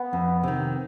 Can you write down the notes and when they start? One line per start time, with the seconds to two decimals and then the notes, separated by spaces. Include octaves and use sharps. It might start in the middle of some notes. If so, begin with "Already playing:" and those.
Already playing: B3
0.13 F2
0.43 C3 D#3